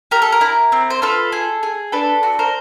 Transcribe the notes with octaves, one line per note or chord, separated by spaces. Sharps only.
G4 A#4
A4
A#4
E4
C4
C5
F4 A4 B4
G#4
G#4
D4 A4 B4
F#4
A#4 C5